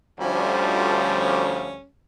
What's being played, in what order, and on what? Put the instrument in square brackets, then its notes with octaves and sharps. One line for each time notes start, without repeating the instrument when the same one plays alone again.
[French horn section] D2 F3 [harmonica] G3 C#4